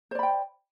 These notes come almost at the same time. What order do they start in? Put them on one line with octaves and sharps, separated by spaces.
C5 D5 B5 G5